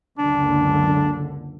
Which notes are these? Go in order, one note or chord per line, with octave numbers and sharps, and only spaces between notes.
F#1 C#2 D3 D4